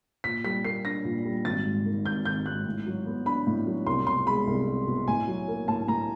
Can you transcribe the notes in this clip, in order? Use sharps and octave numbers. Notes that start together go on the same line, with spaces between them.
A#2 B6
G3 B6
A#3 C7
D4 A#6
A#2
G3
G#1 A6
G#2
D#3
G#1 G6
G#1 G6
G#2 F#6
A2
F#3
B3
D4 B5
A2
F#3
C2 C6
B2 C6
G#3 B5
C2
C2
B2
A2 G#5
F#3
A#3
A2 A5
A2 A#5